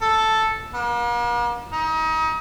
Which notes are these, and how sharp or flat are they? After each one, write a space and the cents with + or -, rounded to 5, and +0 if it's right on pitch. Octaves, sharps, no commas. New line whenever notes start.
A4 +0
A#3 +45
D#4 +35